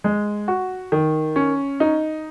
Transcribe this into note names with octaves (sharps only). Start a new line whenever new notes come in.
G#3
F#4
D#3
C#4
D#4